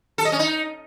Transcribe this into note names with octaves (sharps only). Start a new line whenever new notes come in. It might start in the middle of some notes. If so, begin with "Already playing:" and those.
A4
D#5
C#4
D#4